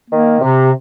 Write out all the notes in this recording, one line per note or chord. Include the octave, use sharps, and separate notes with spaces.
D#3 A#3
C3